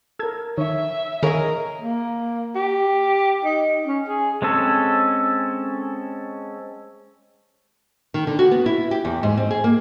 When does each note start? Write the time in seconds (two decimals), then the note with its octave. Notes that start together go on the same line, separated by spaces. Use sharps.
0.19 A4 A#4 E6 G#6
0.58 D#3 C#5 E5
1.23 D#3 G#4 A#4 C#5 D#5 F5
1.82 A#3
2.55 G4
3.45 D#4
3.87 C#4
4.08 G#4
4.42 G#3 C4 C#4 A4
8.14 D#3
8.27 D3
8.39 F#4
8.51 B3
8.66 E4
8.91 G4
9.05 E2
9.23 G#2
9.37 C4
9.51 G#4
9.64 A#3